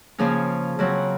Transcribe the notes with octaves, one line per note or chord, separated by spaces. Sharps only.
C#3 F3 A#3 C#4 G#4
C#3 F#3 C4